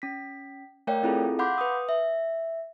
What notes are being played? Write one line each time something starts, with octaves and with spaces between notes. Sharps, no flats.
C#4 B6
A3 A#4 C#5 D5 F5 G5
C4 E4 F4 G#4 A4
F5 F#5 B5 C6 D6 G6
B4 D#6
E5